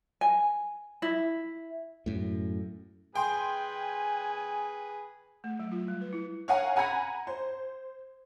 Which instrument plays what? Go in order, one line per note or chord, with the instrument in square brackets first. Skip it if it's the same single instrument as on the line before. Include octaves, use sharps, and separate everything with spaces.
[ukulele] G#5
E4
[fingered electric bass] F#2 A2
[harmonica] G#4 B4 [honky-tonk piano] G5 C6 [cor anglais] G#5
[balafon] A3
F#3
F4
G3
B4
E4
[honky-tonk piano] C#5 F5 F#5 G#5 A#5
F#5 G#5 A#5 B5 G#6 C#7
C5